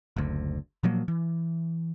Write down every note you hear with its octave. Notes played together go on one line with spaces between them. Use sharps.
F#1 D2
A#2 F3 F#3 A#3
E3